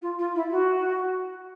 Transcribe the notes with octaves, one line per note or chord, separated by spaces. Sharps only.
F4
F4
E4
F#4